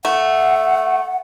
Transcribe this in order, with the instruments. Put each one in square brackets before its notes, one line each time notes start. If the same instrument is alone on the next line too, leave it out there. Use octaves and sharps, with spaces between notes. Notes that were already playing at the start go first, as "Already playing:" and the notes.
[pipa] A3 [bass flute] F#5